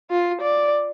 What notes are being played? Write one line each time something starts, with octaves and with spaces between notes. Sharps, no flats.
F4
D5